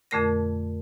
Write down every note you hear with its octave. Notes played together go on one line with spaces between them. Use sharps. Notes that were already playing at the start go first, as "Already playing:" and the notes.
F2 A#2 D3 A3 A#4 A#6